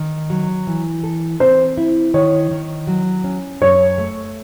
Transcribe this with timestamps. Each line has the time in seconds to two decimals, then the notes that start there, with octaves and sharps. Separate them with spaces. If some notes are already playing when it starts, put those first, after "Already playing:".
Already playing: D#3
0.30 F#3
0.67 E3
1.04 A4
1.40 C4 C5
1.77 E4
2.14 D#3 C#5
2.51 D#3
2.87 F#3
3.24 C#4
3.61 F#2 C#5
3.98 A3